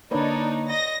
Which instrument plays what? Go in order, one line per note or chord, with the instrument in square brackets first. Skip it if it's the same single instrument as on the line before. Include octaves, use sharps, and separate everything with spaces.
[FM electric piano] D3 A#3 [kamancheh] D4 [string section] D#4 [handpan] B4 C#5 D5
[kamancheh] D#5 [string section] A#6